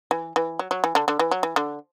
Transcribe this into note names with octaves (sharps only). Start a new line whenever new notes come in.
E3
E3
F#3
F#3
E3
D3
D3
E3
F#3
E3
D3